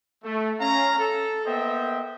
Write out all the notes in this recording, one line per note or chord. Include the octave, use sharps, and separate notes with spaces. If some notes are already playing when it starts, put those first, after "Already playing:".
A3
C#4 F5 A#5
A4
A#3 B3 C5 D#5 E5 G5